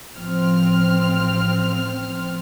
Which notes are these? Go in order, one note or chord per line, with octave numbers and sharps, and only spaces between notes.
A1 F3 C4 F6